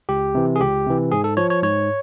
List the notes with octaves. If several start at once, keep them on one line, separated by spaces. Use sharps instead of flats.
C#2 G4
C3 E3
G#4
C#2 G4
C3 E3
G#2 G#4
A4
F3 C#5
C#5
G#2 C#5